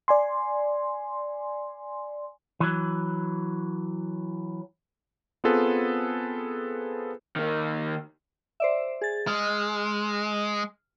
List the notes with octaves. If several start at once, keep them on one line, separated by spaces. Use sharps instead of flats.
D5 G#5 C6
E3 F#3
B3 C4 F4 G#4 A4 B4
D#3 A#3
C5 D5 E5
G#4 A6
G#3 F6